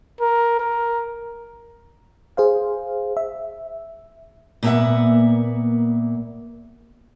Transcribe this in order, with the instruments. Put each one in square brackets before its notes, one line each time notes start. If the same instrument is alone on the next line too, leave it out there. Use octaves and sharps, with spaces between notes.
[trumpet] A#4
A#4
[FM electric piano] G#4 C5 F5
E5
[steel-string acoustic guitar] A#2 A#3 B3 F#4 E5 F#5